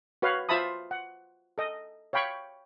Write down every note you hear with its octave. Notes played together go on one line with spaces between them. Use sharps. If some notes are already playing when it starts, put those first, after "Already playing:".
F#4 B4 C#5 F5
F4 C5 E5 A5 B5 D#6
F#5
A4 D#5
C#5 F5 G5 B5 C#6